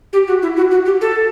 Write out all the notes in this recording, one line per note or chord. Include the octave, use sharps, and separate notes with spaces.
G4
F#4
E4
F#4
F#4
G4
A4